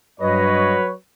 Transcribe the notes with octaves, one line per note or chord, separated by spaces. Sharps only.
G2 F#3 G3 B4 C#5 D#5